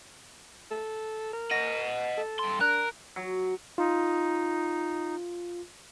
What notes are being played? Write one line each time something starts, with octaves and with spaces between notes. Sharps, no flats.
A4
A#4
D#5 F#5 A#6
A4
G2 C6
D4 A#4 F#6
F#3
D#4 F4